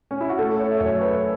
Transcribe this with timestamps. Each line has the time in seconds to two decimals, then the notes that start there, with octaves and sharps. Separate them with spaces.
0.11 C#4
0.20 E4
0.29 F#4
0.38 A3 A4
0.59 C#5
0.71 E5
0.80 F#2 C#5
1.01 B4